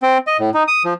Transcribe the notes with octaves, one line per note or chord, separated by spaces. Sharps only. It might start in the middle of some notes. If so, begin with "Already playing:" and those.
C4
D#5
A2
D#4
D#6
F3